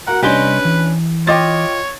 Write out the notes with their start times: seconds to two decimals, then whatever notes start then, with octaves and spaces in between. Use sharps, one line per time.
0.07 F#4 A#4 F#5
0.23 C2 C#4 D4 G4 B4 D#5 G#5 C6
0.65 E3
1.27 F4 C#5 D#5 G5 D6 A6